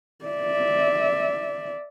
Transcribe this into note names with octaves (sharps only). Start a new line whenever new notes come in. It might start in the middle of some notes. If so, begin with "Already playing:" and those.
D5 E5